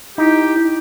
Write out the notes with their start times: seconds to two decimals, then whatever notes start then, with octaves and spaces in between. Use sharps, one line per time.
0.18 D#4 E4 G4